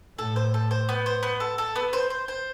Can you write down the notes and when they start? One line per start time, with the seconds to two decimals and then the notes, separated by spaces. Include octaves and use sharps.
0.18 A2 A4
0.36 C5
0.54 A4
0.71 C5
0.89 B3
1.06 C5
1.23 B3
1.40 A4
1.58 A4
1.76 B3
1.93 C5
2.10 C5
2.28 C5